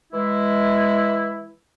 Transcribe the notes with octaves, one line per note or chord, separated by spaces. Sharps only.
E3 G#3 E4